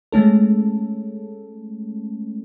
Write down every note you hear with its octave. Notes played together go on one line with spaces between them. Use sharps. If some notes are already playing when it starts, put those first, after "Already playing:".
G#3 A3 C#4 A4